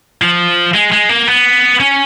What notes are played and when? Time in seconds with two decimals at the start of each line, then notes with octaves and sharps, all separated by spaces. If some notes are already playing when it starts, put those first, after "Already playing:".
0.22 F3
0.74 G#3
0.92 G#3
1.09 A#3
1.27 B3
1.80 C#4